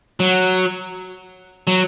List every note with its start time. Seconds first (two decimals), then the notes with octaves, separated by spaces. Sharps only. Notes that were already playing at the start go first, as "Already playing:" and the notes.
0.20 F#3
1.67 F#3